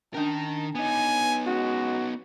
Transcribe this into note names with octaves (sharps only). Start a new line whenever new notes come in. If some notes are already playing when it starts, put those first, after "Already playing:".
D#3 C#4 D4 A#4 A5
B3 D#4 G#5
G#3 C#4 F#4